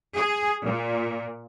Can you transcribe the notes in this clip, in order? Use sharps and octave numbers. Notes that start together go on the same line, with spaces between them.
G#4
A#2